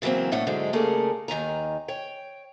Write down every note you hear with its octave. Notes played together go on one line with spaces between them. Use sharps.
C#3 E3 F#3 A#3 C4
A2 A#3 C#4 D4 F#5
G#2 D3 F#3 G#3
C#3 G3 A3 A#3 G#4 A#4
D#2 D#3 G#5 A#5
C#5 G5